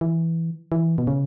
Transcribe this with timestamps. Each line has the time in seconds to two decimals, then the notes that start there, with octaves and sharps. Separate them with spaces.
0.01 E3
0.72 E3
0.98 B2
1.07 C#3